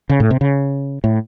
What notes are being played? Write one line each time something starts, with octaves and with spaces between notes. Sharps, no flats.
C#3
A2
C3
C#3
A2